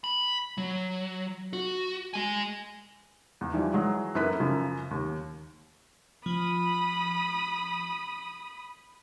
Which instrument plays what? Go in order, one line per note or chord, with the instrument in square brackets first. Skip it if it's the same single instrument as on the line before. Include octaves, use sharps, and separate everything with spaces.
[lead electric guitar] B5
F#3
F#4
G#3 G#5
[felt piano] E2
E3 F3 G3
E3 F#3 G#3
F#2 A#3 E4 A4 B4 B6
F#2 C#3 F3
D#2
[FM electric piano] F3 [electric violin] B5 D#6